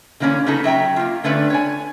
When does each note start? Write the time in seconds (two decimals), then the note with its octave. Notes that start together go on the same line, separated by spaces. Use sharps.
0.20 D3 E3 A#3 C4 C#4
0.46 C#3 B3 D#4 F#4 A4
0.64 F#3 E5 G5 A#5
0.96 A#3 F4
1.24 D3 A3 C#4 B4 D5
1.50 C#5 G#5